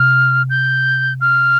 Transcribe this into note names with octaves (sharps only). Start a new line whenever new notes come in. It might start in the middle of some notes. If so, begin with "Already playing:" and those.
Already playing: C3 F6
G6
F6